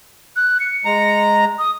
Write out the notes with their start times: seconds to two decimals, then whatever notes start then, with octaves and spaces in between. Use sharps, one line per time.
0.36 F#6
0.60 C#7
0.85 G#3 A#5
1.59 D#6